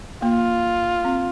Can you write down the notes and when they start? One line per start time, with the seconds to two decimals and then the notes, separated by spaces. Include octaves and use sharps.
0.22 A#3 F4
1.05 C4